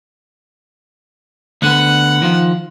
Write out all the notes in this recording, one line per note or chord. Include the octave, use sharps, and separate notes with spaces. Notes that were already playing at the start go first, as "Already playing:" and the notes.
D2 D3 B3 F#5
D#3 F3 F4